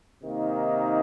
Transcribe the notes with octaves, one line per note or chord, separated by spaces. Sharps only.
C3 D#3 A#3 D#4